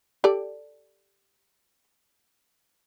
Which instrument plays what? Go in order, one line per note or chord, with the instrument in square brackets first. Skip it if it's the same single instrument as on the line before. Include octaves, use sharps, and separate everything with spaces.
[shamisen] G4 A4 D5